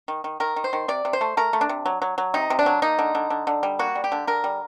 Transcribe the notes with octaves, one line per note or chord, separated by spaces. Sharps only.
D#3
D#3
D#3 A#4
D#3
C5
D#3
C3 D5
C3
C5
A3
A3 A#4
A3
D4
C3
F#3
F#3
F#3
C3 D#4
C3
D4
F#3
A#3 D#4
D3
D3
D3
D3
G3
A#3 F#4
G3
G4
D3
D3 A#4
G3